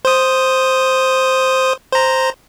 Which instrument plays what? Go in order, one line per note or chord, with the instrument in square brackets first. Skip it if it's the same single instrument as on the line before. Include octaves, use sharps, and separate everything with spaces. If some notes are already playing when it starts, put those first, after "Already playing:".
[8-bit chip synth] C5 D#6
C5 A#5